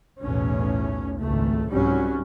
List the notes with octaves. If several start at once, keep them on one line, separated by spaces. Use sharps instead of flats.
B1 E2 A2 C#4
G#1 C#2 A3
C2 G#2 F#3 G3 C#4